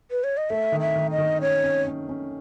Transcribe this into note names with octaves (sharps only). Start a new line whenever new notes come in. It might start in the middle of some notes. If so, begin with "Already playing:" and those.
B4
C#5
D#5
A3 E5
D#3
E5
D#3
D#5
D#3
C#4 C#5
C#4
C#4
C#4